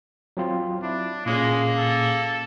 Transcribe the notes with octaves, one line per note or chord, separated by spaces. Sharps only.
F#3 C4 F4
D4 E4
A#2 G#3 A#3 C#4 G#4
A4